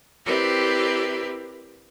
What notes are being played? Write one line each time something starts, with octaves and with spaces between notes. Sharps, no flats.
C4 E4 G4 A#4 B4 D5